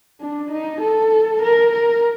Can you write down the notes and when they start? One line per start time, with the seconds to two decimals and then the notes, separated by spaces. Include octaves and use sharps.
0.20 D4
0.51 D#4
0.81 A4
1.42 A#4
1.73 A#4